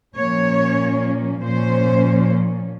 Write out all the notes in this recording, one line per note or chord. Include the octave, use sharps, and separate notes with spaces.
A#2 F3 A#3 C#4 C#5
A#2 F3 A#3 C#4 C5